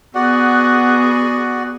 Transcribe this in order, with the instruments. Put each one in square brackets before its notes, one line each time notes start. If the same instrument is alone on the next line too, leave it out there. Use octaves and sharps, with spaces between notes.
[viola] B3 G#4 [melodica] F#4 D5 F#5